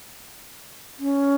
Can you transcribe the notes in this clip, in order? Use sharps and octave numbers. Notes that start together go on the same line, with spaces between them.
C#4